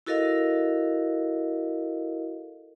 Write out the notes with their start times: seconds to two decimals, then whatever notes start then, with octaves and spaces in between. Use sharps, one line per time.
0.06 E4 F#4 A4 A#4 D#5 F5